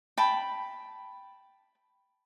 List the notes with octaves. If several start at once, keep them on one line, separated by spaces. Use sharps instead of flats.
G5 A5 B5